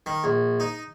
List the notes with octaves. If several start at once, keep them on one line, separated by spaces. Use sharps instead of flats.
D#3
A#1
D#4